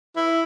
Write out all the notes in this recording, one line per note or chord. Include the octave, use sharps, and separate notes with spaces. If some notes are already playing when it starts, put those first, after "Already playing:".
E4